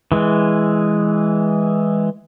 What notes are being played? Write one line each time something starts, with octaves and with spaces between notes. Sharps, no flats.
E3 G#3